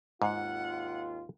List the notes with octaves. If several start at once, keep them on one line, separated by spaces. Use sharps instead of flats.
G#1 D#2 G#2 F4 F#5